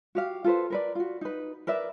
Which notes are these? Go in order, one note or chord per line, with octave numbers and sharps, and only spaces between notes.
F#4 G4 F5
F4 A4 B4 C5
A#4 B4 D5
F4 F#4
D#4 B4
A#4 B4 D5 E5